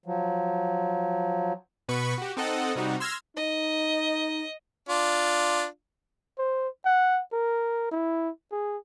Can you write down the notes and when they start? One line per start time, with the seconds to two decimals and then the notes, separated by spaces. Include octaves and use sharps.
0.06 F3 F#3
1.89 B2 B4 B5 C#6
2.18 F#4 G4
2.37 C4 D#4 A4 D#5 F#5
2.75 C3 G3 D#4 F#4
3.00 C6 E6 F6 G#6 A#6
3.36 D#4 D#5
4.89 D4 F4
6.39 C5
6.85 F#5
7.33 A#4
7.92 E4
8.52 G#4